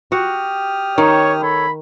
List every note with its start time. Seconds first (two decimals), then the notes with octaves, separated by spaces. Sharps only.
0.12 F#4 G4 D#6 F6
0.98 D#3 C#5
1.42 A4 C#5 B5